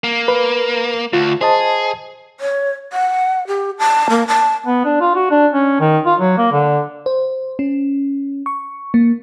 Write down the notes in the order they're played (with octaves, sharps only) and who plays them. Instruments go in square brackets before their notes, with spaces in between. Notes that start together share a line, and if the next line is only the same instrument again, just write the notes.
[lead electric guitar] A#3
[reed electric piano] B4
[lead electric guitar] D2 [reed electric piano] F4
[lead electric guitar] G#4 [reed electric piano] C5 D#5 A5
[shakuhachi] C#5
F#5
G4
A5
A#3
A5
[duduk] B3
D4
F4
F#4
D4
C#4
D#3
F4
F#3
A#3
D3
[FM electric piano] C5
C#4
C#6
A#3